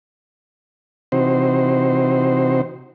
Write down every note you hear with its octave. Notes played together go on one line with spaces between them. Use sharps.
C3 E3 C4 D#4 F#4 C5